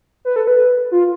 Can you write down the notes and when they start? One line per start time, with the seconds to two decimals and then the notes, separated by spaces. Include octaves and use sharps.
0.25 B4
0.36 A4
0.47 B4
0.91 F4